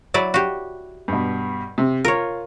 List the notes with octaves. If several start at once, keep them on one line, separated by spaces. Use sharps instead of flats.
F#3 E4 D5
F#4 G4
G2 B2
C3
F4 A#4 C#5